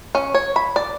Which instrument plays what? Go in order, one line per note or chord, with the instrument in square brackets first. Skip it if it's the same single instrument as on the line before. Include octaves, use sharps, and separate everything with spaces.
[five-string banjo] C#4
C#5
B5
D5